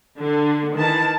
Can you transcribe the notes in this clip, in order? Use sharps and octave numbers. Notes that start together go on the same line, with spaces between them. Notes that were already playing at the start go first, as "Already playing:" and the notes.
D3
D#3 E3 A5